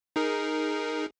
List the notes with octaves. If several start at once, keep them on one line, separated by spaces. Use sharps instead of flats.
D#4 G#4 A#4